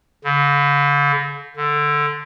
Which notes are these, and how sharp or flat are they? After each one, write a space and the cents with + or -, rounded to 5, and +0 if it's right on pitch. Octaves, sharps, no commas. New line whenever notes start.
D3 -45
D3 +5